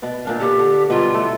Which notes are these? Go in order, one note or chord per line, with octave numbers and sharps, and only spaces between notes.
B2 B3 D5
A#2 D4 F5
B3 F#4 G4 A4
D3
B2 F#3 G3 F4
A3 E4 F#4